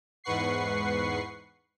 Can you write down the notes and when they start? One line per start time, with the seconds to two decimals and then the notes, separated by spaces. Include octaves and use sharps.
0.24 E2 G#2 B4 F#5 C#6 C7